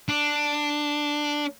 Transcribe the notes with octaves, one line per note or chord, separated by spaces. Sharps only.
D4